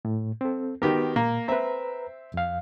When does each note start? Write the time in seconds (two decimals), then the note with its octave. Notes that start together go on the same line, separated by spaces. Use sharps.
0.05 A2
0.41 C4 A4
0.82 D#3 B3 F#4 G4 A#4 B4
1.16 A#2 A#3
1.48 C4 B4 E5 A#5
2.34 F2 F5